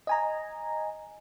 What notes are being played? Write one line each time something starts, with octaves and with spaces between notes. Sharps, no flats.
D#5 G#5 A#5